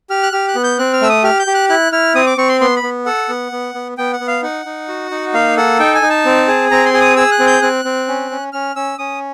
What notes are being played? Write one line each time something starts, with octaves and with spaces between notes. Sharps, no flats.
G4 F6
F#6
G4 F6
F#6
B3
G6
C4 F#6
F6
A3 E6
D#6
G4 F6
G6
G4
F#6
E4 F#6
E4 F6
C4 D#6
D6
C4 C#6
C6
B3 C6
B5
B3
A4 F#5
B3
B3
B3
B3 G5
F#5
B3
F5
D#4 F#5
D#4
F#4
D#4
A#3 F5
A4 F#5
D#4 G5
G#5
D#4
A5
C4
G#4
C4 A#5
C6
G#4
D#6
G#4 E6
F#6
C4
G6
C4 F#6
C4
C#4
C#4
C#4 F6
C#4 E6
C#4 D#6